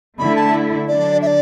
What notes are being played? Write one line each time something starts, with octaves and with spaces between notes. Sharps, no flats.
D3 A3 E4 B5
A5
D3 F#3 D4 D5
E5
D5